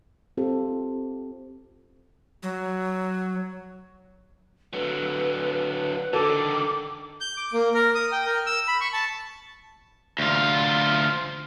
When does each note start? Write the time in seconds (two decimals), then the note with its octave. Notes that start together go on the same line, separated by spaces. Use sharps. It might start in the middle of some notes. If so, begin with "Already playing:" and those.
0.37 C4 F4 G4 A4
2.43 F#3
4.73 D3 F#3 B4
6.13 D3 D#3 A4 D6
7.21 G6
7.37 D6
7.53 A#3
7.74 A#4
7.95 D#6
8.12 G5
8.26 A#4
8.47 E6
8.68 B5
8.81 C#6
8.93 A5
10.19 D2 F4